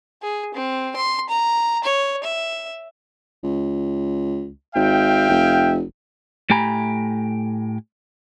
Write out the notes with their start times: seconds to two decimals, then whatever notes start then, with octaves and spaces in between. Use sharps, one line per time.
0.22 G#4
0.54 C4
0.96 C6
1.29 A#5
1.84 C#5
2.24 E5
3.43 C#2
4.75 G#1 E5 F5 G5
5.29 F1
6.50 A2 A3 G4 G#5 A#5 B5